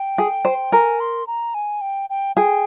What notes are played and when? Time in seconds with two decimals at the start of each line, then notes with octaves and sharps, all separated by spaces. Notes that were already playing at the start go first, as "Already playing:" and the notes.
Already playing: G5
0.18 G#4
0.45 C5
0.72 A#4 G#5
1.00 C6
1.27 A#5
1.54 G#5
1.81 G5
2.10 G5
2.36 G#4 G5